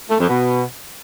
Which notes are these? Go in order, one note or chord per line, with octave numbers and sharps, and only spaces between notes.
A3
F2
B2